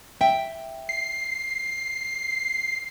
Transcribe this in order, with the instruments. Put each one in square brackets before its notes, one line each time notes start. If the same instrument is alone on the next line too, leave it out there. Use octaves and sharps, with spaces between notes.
[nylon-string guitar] E5 G5
[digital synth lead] C7